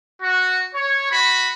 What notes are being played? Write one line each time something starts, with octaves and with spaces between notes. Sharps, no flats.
F#4
C#5
F#4 B5